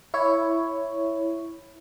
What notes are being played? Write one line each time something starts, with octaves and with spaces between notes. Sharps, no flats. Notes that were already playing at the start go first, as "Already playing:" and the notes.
E4 C#5